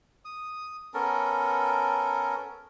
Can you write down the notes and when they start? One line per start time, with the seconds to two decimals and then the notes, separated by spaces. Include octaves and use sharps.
0.25 D#6
0.94 B3 C#4 A4 A#4